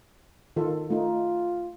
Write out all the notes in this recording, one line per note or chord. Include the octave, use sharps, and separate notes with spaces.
D#3 F4 A4
A3 D#4 F4